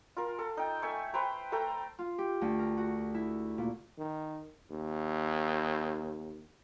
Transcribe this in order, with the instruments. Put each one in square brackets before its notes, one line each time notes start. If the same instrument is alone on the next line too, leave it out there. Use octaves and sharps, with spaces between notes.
[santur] F4 A#4
A4
D#4 G5
A3 E5 G#5 C#6
B4 C5 G5 A#5
A3 A4 G5 A#5
[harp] F4
G4
D2
A#4
F#4
E4
A#2
[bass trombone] D#3
D#2